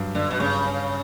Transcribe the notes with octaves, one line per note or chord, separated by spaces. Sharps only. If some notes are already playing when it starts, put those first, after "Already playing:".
Already playing: G2 F#3
G2 D3
B2
G2 C#3
C#4